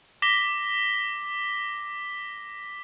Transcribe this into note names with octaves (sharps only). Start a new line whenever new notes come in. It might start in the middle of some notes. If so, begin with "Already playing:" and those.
D6 A#6 B6 G7